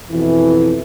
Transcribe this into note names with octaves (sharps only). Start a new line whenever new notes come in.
F2 B2 E3